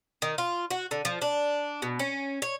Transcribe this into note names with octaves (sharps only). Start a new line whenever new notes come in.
D#3
F4
F#4
D3
F3
D4
B2
C#4
C#5